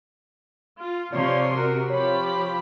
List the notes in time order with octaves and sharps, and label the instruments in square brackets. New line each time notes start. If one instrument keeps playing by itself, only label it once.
[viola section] F4
[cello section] C3 [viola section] F3 C#5 C6 [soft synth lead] D5
[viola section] F#4 A#4
[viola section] F3 G4 B5 [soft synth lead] C#5